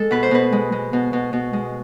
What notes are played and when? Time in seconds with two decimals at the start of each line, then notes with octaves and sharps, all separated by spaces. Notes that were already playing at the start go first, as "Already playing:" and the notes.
Already playing: G#3 A4
0.11 B2 B4
0.23 C5
0.31 B2 B4
0.52 G#3
0.72 G#3
0.93 B2
1.13 B2
1.33 B2
1.53 G#3